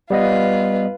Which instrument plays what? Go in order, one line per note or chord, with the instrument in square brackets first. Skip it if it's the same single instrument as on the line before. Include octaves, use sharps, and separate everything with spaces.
[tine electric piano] G3 B3 D#5 [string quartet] F4 B4